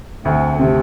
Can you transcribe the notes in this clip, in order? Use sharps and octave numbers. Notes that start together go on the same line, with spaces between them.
D2 A3 C4
C3 A3 C4